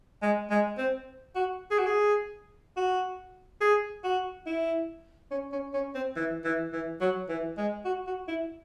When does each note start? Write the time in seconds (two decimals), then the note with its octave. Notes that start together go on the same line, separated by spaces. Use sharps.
0.22 G#3
0.50 G#3
0.78 C4
1.35 F#4
1.71 G#4
1.79 F#4
1.86 G#4
2.77 F#4
3.61 G#4
4.04 F#4
4.46 E4
5.31 C#4
5.52 C#4
5.74 C#4
5.95 C4
6.16 E3
6.44 E3
6.73 E3
7.01 F#3
7.29 E3
7.58 G#3
7.85 F#4
8.07 F#4
8.28 E4